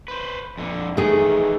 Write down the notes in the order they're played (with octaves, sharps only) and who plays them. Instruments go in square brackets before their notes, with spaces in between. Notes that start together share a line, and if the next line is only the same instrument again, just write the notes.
[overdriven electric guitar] B4 C5
F2 D3
[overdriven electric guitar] D#3 E3 [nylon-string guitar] A3 G#4